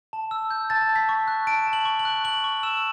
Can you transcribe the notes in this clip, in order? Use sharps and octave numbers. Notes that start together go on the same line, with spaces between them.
A5
E6
G6
A5 A6
A5
B6
C#6
F#6
A5 D7
A5
F#7
C#6
F#7
F#6
C#6 F#7
C#6
E6 E7